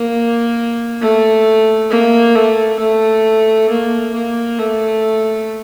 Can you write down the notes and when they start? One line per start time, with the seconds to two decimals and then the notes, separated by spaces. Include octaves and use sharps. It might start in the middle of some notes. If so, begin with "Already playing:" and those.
Already playing: A#3
1.01 A3
1.90 A#3
2.35 A3
2.79 A3
3.70 A#3
4.13 A#3
4.59 A3